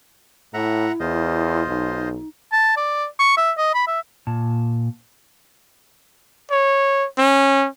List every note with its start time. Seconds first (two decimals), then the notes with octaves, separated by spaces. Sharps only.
0.54 A2 E4 E5 F#5 A#5
1.00 E2 F4 C5 D#5
1.68 B1 D#4
2.52 A5
2.77 D5
3.19 C#6
3.37 E5
3.57 D#5
3.74 B5
3.87 E5
4.27 A#2 A5
6.51 C#5
7.18 C#4